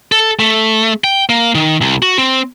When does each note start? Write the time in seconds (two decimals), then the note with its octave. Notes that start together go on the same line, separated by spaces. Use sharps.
0.12 A4
0.39 A3
1.04 G5
1.29 A#3
1.55 D#3
1.81 C2
2.02 F#4
2.18 C4